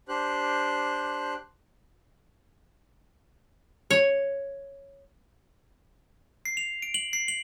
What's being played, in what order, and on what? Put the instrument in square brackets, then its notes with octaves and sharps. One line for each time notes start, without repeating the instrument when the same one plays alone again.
[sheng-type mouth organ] D4 G4 C5 F#6
[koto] C#5
[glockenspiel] C7
F7
D7
F#7
C7
F#7